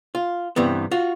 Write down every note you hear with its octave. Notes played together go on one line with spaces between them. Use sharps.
F4
G2 C3 E3 B3
F4 F#4